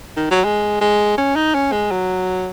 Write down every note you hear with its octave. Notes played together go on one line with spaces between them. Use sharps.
D#3
F#3
G#3
G#3
C#4
D#4
C#4
G#3
F#3